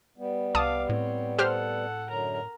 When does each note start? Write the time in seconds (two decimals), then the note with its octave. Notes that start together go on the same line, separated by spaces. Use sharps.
0.18 G3 B3
0.55 C2 F5 A5 D6 D#6
0.89 A2 C4 C#5
1.39 G4 A4 C5 F#5 F6
2.09 F#2 D3 F#3 A#4 A#5